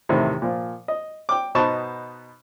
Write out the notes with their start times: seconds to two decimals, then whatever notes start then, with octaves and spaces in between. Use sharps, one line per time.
0.09 E2 A2 C3 D#3
0.42 A#2 F3
0.88 D#5
1.29 G5 D6
1.55 B2 B3 D#4 C5 A5 C#6